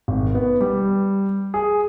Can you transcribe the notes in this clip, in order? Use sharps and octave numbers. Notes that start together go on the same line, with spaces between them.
G#1
B3
G3
G#4